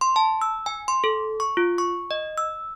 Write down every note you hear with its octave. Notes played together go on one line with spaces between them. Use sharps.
C6
A5
E6
G#5
C6
A4
C#6
F4
C#6
D#5
E6